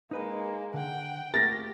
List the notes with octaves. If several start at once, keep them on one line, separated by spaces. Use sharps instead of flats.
G#3 A#3 D#4 B4 D#5
D3 F#5 G5
A3 A#3 G4 A#4 A6 A#6